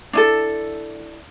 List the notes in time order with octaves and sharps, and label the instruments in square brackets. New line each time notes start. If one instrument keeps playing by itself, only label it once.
[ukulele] D4 E4 A4